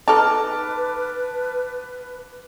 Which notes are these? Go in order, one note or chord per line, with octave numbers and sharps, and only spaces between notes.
D#4 A4 B4 A5 D6 F6